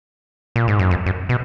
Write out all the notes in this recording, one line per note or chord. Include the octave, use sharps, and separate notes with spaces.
A#2
G#2
F#2
F2
F#2
B2